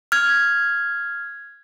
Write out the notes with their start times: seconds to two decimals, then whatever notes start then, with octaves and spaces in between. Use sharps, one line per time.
0.12 F6 G#6